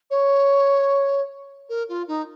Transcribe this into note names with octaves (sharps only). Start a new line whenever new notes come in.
C#5
A#4
F4
D#4